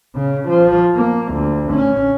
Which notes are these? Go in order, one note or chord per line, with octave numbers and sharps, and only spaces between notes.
C#3
F3
A#3
D2
C#4